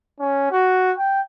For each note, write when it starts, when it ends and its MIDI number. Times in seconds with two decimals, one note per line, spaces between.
0.20 0.48 61
0.51 0.92 66
0.98 1.21 79